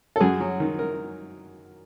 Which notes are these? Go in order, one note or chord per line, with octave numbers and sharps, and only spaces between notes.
A4
F#2 F#4 G#4
F#3
D#3
A#4